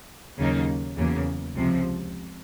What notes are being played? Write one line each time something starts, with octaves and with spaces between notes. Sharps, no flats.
D#2 C#3 F#3 A#3 D#4
E2 C#3 F#3 A#3
C#2 C3 F3